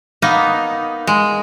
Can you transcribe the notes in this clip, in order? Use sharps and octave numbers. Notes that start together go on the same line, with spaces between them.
A#3 B3 D#4
G#3